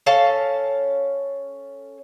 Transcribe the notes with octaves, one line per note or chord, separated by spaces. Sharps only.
C#4 A4 F5 A5